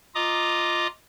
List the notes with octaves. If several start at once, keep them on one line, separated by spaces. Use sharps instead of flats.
F4 D#5 A#5 D6 D#6